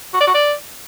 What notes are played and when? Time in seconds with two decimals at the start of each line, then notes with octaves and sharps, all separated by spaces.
0.13 F#4
0.20 D5
0.27 F#4
0.34 D5